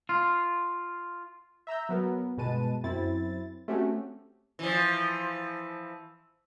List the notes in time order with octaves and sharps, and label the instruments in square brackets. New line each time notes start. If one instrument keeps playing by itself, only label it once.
[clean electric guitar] F4
[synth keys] E5 A#5 E6 G6
F#3 B3 A#4
G1 B2 G#3 B4 A5 D#7
F#2 C4 E4 A6
A3 C4 C#4 F#4 G4
[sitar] E3 F3